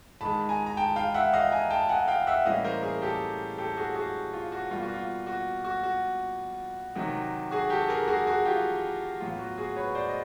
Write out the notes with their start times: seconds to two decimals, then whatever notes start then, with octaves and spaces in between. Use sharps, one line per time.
0.21 G#2 D#3 G#3 A5 B5
0.49 G#5 A#5
0.66 A#5
0.77 G5 A5
0.96 F5 G5
1.14 E5 F#5
1.33 D#5 F5
1.51 G#5 A#5
1.70 G5 A5
1.89 F#5 G#5
2.08 F5 G5
2.27 E5 F#5
2.45 A2 E3 G3 A#3 C#4 D#5 F5
2.64 A#4 C5
2.83 G#4 A#4
3.02 G4 A4
3.58 G4 A4
3.77 F#4 G#4
3.96 F#4 G#4
4.33 F4
4.52 F#4
4.71 B2 G3 A#3 F4
4.83 F#4
4.94 F4
5.27 F#4
5.64 F#4
5.83 F#4
6.95 C3 D#3 F#3
7.51 F#4 G#4
7.70 G4 A4
7.89 G#4 A#4
8.08 F#4 G#4
8.27 F#4 G#4
8.45 F4 G4
9.20 A2 F#3 B3 F4
9.39 F#4
9.58 F#4 G#4
9.76 B4 C#5
9.95 C5 D5
10.09 D#5